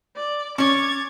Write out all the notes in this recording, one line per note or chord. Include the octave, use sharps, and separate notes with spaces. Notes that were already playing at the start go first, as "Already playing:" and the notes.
D5
C#4 C#5 D6 G#6 A6